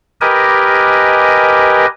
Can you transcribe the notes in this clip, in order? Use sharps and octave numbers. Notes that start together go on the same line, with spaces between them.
G4 A#4 B4 D#5 G#5